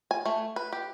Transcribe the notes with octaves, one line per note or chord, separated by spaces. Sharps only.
G#5
A3
B4
G4